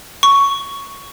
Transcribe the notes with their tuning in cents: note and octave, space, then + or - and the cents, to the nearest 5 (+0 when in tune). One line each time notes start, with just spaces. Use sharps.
C#6 +5